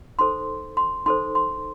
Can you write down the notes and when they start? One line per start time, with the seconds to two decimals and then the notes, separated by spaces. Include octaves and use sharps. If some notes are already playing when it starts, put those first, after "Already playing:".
0.19 D#4 A4 C5 C6
0.77 C6
1.06 D#4 A4 C5 C6
1.35 C6